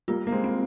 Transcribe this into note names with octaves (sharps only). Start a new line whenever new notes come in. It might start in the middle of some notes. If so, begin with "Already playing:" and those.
G3 A#3 F4
A#3
G#3 C4
C4